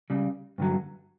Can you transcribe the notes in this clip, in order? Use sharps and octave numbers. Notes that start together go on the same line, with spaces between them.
C#2 C#3 G3
G2 D3 F#3